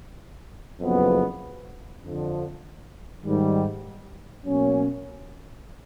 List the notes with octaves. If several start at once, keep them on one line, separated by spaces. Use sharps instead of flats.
F#1 F2 C#3 F#3 B3
F2 D3 F3
G#2 D#3 G3
B2 F#3 A#3 C#4